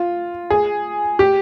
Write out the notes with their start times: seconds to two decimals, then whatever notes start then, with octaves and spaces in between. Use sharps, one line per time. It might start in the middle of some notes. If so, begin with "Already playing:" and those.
Already playing: F4
0.50 G#4
1.19 G4